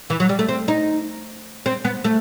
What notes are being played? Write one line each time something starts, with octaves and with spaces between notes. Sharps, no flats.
E3
F#3
G3
A3
C4
D#4
C4
B3
A3